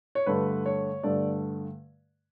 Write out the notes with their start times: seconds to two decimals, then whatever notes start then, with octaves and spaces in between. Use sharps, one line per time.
0.15 C#5
0.26 G2 D3 A3 B4
0.66 C#5
1.03 G2 D3 A3 D5